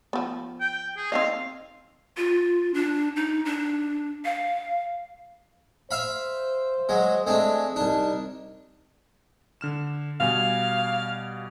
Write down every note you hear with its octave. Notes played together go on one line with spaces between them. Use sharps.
F3 B3
G5
G#4
C4 D#4 D#5 F5
F4
D4
D#4
D4
F5
C5 E5 F5 B5
F#3 G#3
G#3 A3 C4 D4
C2 D4 D#4
D3 F6 E7
B2 G3 F5 G#5